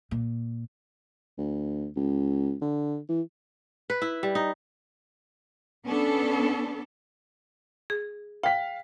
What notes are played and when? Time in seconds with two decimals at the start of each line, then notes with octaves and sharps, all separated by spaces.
0.11 A#2
1.38 D2
1.96 C#2
2.62 D3
3.09 E3
3.90 B4
4.02 E4
4.23 G3
4.35 D#4
5.85 B3 C#4 D4 A4
7.90 G#4
8.43 F5 G5 B6